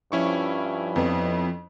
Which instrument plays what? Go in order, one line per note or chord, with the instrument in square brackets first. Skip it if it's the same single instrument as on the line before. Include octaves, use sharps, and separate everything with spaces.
[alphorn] G2 [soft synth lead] F3 [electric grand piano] C#4 E4 C#6
[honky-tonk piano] F2 B3